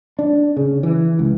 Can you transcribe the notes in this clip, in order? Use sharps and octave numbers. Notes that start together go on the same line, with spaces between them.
D4
C#3
E3
C#2